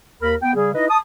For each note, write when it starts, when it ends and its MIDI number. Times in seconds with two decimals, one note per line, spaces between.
0.22 0.35 39
0.22 0.35 70
0.22 0.35 83
0.43 0.53 59
0.43 0.53 79
0.55 0.73 49
0.55 0.73 55
0.55 0.73 68
0.75 0.87 63
0.75 0.87 64
0.75 0.87 71
0.75 0.87 75
0.89 0.98 81
0.89 0.98 87